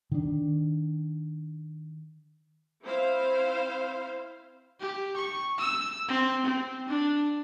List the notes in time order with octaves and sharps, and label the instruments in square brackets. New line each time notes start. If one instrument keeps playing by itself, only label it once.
[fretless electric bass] D#3 D4
[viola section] C4 E4 C5 F5
[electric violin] G4
C#6
E6
C4
C4
D4